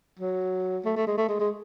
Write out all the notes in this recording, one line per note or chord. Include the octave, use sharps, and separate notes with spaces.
F#3
A3
A3
G#3
A3
G#3
G#3